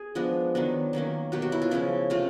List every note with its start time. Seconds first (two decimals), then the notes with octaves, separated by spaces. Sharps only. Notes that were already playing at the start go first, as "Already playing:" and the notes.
Already playing: G#4
0.15 F3 G#3 B3 D4
0.55 D#3 F#3 B3 D4
0.93 D#3 F#3 A#3 C#4
1.32 B2 F#3 A#3 G4
1.42 F#4
1.52 E4
1.62 F4
1.71 C#3 F3 G#3 C#4 E4
2.10 C3 E3 A3 C4 F4